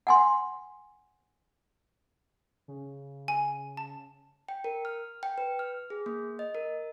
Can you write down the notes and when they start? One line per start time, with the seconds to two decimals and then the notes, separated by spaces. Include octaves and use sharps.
0.07 F#5 G#5 C6
2.68 C#3
3.28 G#5
3.77 A5
4.49 G5
4.64 A#4
4.85 F6
5.23 G5
5.38 B4
5.59 F6
5.90 G#4
6.06 A#3
6.39 D#5
6.55 A#4